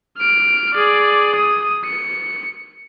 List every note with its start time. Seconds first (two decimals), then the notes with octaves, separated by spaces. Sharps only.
0.18 F6 D7
0.74 G#4 D5
1.35 D#6
1.85 C#7